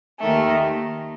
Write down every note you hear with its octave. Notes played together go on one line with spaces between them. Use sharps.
D#2 D#3 A3